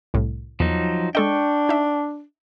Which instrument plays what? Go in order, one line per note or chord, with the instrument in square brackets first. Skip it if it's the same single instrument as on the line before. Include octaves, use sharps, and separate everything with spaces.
[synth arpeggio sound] C2 A2
[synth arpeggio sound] E2 [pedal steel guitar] F3 F#3 D#4
[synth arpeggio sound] G#3 A4 D#5 [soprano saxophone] D4 [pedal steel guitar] G5 C#6
[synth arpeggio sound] D#4 E5